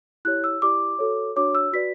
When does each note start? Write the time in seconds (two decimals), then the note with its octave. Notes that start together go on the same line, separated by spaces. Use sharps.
0.25 E4 G4 C#5 F#6
0.44 E6
0.62 E4 G4 D5 D6
0.99 F#4 A4 C#5
1.36 D4 F#4 C#5 D6
1.55 E6
1.73 F#4 B4 D5 B6